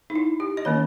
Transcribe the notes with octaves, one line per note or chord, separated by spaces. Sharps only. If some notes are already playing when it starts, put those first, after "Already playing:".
D#4
E4
G4
D#5
D#3 A#3 C#4 C#5